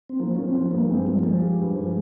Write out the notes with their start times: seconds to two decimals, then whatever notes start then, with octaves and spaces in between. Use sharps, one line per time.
0.09 C4
0.19 F3 A#3
0.35 F3 C#4
0.45 C4
0.54 F3
0.71 G2 A#3
0.89 G#3 C4
1.06 F3 G3
1.19 A#3
1.23 F3 G#3
1.40 G4
1.58 G2
1.76 F3